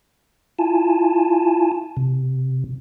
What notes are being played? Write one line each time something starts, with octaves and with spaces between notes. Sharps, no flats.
E4 F4 G#5 A5
C3